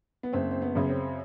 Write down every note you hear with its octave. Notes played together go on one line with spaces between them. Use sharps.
B3
F#1 C4
C4
B3
F#2 C#3
C4